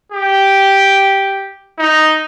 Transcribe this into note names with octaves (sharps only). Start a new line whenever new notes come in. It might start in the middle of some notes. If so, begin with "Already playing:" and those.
G4
D#4